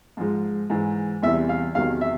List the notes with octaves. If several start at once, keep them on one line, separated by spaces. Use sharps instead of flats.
G#2 F3 G#3
G#2 E3 G#3
E2 C3 E3 G3 E5
F5
E2 C3 D#3 F#3 F5
E5